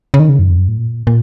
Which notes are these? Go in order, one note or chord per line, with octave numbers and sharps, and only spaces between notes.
C#3
D#3
C#3
F#2
F2
F#2
A2
A#2
A#2